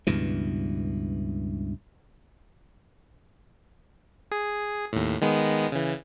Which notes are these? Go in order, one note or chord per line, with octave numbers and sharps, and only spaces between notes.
C#2 G2 B2 E3
G#4
D#2 A2
D#3 G#3 B3
C#3 E3